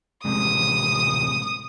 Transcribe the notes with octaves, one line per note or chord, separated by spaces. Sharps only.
A1 C3 G#3 D#6